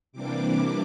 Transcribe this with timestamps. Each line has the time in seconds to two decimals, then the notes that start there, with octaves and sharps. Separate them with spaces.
0.12 C3 E3 G3 A#3 D4 D6